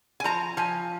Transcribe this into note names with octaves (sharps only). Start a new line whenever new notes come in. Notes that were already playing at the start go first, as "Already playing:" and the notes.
G#5
F3 A#5
F3 G#5